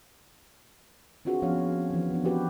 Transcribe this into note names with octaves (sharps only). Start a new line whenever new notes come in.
C4 D4 F4 F#4 G#4 B4
F3 B3 C#4 C#5 F5
E3 F3
B3 D4
C4 E4 F#4 G4 B4